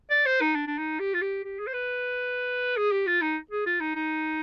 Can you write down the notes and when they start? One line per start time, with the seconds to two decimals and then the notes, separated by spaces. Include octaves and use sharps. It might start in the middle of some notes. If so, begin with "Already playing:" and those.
0.11 D5
0.26 C5
0.41 D#4
0.55 D4
0.67 D4
0.78 D#4
1.00 G4
1.14 F4
1.22 G4
1.44 G4
1.59 G#4
1.67 C5
1.74 B4
2.77 G#4
2.92 G4
3.07 F4
3.22 D#4
3.51 G#4
3.66 F4
3.81 D#4
3.96 D#4